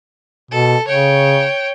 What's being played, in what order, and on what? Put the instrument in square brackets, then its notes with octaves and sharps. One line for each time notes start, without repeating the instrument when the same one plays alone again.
[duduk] B2 [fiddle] A4
[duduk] C#3 [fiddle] C#5 G5